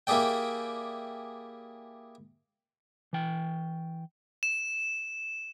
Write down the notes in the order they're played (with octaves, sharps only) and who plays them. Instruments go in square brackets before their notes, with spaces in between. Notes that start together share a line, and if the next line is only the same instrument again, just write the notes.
[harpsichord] A#3 E4 G4 G#4 D5 G5
[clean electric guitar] E3 G5
[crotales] E7